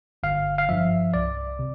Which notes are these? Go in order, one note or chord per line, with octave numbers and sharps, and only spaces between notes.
G1 F5
F5
G2 F3 E5
C2 D5
C3